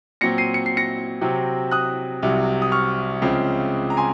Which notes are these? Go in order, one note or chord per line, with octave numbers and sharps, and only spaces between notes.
A#2 F#3 C4 A#6 C#7
C7 D#7
C#7
C7
A#6 C#7
C3 F#3 C4
D#6 F#6
C2 C3 F#3
D#6
C#6 F6
C#2 C#3 F3 C4
A#5
G#5 C6